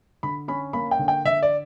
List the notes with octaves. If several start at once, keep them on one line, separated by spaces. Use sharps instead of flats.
D3 B5
C#4 B5
A#3 B5
G5
D3
G5
D3 E5
D5